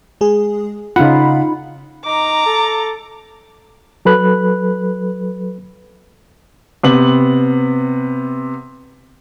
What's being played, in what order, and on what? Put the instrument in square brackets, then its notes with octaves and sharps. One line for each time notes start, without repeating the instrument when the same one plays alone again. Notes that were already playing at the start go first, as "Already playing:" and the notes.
[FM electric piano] G#3 G#4
[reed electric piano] C#3 F#5 [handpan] D#4 F4 [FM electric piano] B5
[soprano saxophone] D#4 [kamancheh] A#5 D6
[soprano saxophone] A4
[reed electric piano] F#3 A4 B4 B5 F#6
[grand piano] C3 B3 F#7